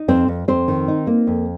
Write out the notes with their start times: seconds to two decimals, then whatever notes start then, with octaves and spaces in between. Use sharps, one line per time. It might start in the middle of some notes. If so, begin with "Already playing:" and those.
Already playing: D#4
0.08 F2 C4 C5
0.28 F2
0.48 F2 C4 C5
0.68 D#3
0.88 D#4
1.07 A#3
1.27 F2